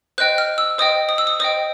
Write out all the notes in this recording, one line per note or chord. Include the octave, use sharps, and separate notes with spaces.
C5 D#5 G5 F#6
F6
E6
C5 D#5 G5 D#6
D#6
E6
D#6
C5 D#5 G5 D#6